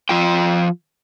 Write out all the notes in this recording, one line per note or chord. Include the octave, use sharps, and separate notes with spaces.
F3 F4 G5